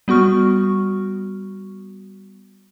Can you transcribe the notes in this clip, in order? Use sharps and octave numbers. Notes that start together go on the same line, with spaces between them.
G3 B3 F#4 C#6 F6